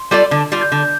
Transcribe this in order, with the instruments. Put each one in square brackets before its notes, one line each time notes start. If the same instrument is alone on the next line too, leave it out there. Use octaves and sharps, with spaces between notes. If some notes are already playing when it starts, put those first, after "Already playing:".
Already playing: [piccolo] C6
[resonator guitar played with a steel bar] G3 F4 A4 D5
[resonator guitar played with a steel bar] D3 [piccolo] A5
[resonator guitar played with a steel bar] G3 F4 [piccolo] A6
[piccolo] G6
[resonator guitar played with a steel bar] D3